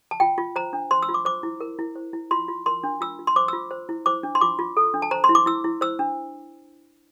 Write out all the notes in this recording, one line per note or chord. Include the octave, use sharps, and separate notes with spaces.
A5
F4 G5
F4
C5 A#5
D4
C5 C6
E6
F4
D6
C5 D6
E4
A#4
E4
C5
E4
F4 C6
F4
A#4 C6
D4
F4 E6
F4
C6
C5 D6
E6
F4
C5
E4
C5 D6
D4
C6
F4 D6
F4
A4
D4
A5
C5 A#5
C6
E4
D6
E4 E6
E4
C5 E6
D4